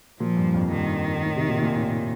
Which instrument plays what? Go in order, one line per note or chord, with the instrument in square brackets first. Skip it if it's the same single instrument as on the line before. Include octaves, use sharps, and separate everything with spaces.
[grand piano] A#2 [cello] F3
[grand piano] G2
F2
[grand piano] G2 [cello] D#3
[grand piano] A2
C3
A#2
A#2
A2